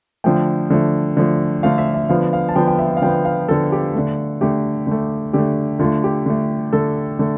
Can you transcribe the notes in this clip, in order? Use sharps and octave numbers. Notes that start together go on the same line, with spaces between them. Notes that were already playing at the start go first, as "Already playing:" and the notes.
D3 F3 A3 G5
D3 F3 A3
D3 F3 A3
D3 F3 A3 F5
E5
E5
D3 F3 B3 F5
F5
A5
D3 F3 B3 G5
G5
E5
E5
F5
D3 F3 B3 G5
F5
D3 F3 B3 A4
G4
D3 A3
D3 A3 G4
D3 A3
D3 A3 G4
D3 A3 F4
G4
D3 A3
D3 A3 A4
D3 A3